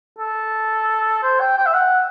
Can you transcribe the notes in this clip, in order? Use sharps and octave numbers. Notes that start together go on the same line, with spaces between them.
A4
C5
G5
G5
E5
F#5